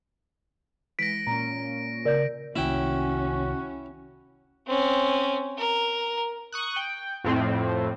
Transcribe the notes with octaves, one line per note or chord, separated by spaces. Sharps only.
E3 G#3 F#6 A#6 B6 C#7 D7
A#2 C#4 A#5
C#3 A#4 D5 G6
C2 D#3 A#3 C#4 E4 F#4 G5
C4 C#4
A#4
C#6 D#6 F#6
G5
F2 A2 C4